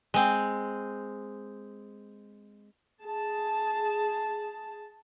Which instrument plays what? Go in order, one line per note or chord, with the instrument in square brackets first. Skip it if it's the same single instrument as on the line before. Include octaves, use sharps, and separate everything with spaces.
[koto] G#3 C4
[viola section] G#4 A5